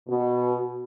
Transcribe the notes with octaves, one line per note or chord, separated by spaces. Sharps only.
B2